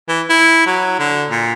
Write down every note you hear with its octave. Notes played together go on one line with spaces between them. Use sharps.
E3
E4
F#3
D3
A#2